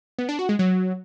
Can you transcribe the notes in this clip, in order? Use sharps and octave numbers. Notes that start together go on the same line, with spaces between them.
B3
D4
F#4
G#3
F#3